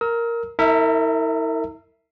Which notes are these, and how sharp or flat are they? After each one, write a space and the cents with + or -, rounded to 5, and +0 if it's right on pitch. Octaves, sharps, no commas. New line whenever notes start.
A#4 +0 E6 -45
E4 -40 A#4 -35 E5 +0